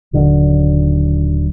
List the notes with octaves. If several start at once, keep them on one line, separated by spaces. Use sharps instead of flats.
D#1 D3 F#3